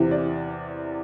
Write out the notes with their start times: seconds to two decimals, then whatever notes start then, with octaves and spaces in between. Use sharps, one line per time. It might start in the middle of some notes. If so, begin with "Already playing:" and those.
Already playing: E2 C3 E3
0.11 D5